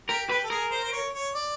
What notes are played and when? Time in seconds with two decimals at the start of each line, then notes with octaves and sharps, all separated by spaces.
0.08 G4 A#4
0.29 G4 B4
0.44 A4
0.50 G#4 A#4
0.71 C5
0.84 C5
0.92 C#5
1.14 C#5
1.35 D5